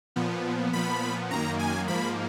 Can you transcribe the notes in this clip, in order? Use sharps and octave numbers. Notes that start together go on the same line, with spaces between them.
A#2 F3 B3
A#2 F3 B3 B5
F#2 D#3 A#3 A#5
G#5
G#2 F3 A#3 B5